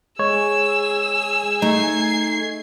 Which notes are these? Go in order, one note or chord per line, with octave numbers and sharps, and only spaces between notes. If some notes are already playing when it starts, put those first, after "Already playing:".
G#3 G#4 C#5 G#5 E6
A3 D#4 G#6 C7